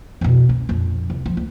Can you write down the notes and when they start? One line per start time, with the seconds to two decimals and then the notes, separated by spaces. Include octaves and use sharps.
0.21 F2 B2
0.49 C#4
0.69 A#1 F2
1.10 C2
1.26 F3
1.37 D2